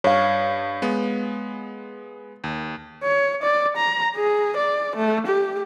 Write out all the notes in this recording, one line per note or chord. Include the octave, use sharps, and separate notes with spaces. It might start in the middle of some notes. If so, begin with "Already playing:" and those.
G2 C#5 F5
G#3 B3
D#2
C#5
D5
A#5
G#4
D5
A3
G4